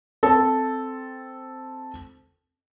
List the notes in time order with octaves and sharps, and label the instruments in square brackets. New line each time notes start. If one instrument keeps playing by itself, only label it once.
[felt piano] C4 A4